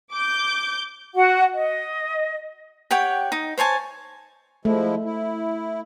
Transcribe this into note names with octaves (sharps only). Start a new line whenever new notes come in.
D6 G6
F#4 F#5
D#5
G4 C#5 F#5 G5
D#4
C5 C#5 G#5 A5
F3 G#3 A3 E4
E4